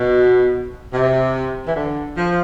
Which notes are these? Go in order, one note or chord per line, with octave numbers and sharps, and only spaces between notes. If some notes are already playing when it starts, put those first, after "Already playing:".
Already playing: B2
C3
E3
D3
F3